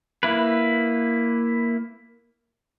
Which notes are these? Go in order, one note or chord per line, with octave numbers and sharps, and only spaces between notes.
A#3 E4 B4